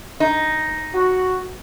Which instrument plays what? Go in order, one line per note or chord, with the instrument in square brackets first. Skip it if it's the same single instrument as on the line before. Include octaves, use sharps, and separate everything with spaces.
[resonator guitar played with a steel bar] D#4
[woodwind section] F#4